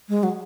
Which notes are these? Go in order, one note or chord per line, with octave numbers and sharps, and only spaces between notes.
G#3
F#3